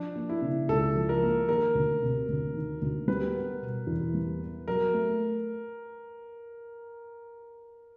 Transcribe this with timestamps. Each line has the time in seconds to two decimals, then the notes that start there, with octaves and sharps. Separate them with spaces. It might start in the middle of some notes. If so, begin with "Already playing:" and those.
Already playing: F3 D4
0.16 A#3
0.29 E4
0.42 C#3
0.69 C#2 A4
0.95 F3
1.09 A#4
1.23 A#3
1.48 D#3 A#4
1.75 D2
2.02 C3
2.28 D2
2.55 D#3
2.82 D2
3.08 G3 B4
3.35 B3
3.62 B2
3.87 E2
4.14 G3
4.41 B3
4.68 F#3 A#4
4.94 A3